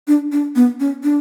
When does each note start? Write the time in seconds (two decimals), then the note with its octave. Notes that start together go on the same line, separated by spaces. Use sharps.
0.08 D4
0.32 D4
0.56 B3
0.80 C#4
1.03 D4